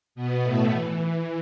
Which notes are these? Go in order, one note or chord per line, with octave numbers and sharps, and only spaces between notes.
B2 B3
A2 A3
E3